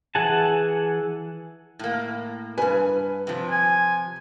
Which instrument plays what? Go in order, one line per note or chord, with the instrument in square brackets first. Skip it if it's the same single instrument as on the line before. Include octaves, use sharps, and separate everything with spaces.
[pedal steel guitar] E3 G#4 F#5 G#5 A5
[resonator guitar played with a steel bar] A2 A#3
[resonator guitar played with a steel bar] G2 G#5 [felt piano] B4
[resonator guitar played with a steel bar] C3 F3
[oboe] G#5